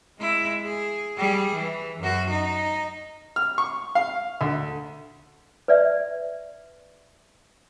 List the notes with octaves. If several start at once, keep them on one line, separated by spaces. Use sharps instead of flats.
G#3 E4
G#4
G3 G#4
E3
F#2 F#4
D#4
F6
C#6
F5
D2
B4 D5 E5